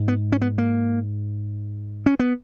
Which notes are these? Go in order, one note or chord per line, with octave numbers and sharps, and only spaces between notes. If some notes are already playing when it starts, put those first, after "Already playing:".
Already playing: G#2
B3
C#4
B3
A#3
C#4
B3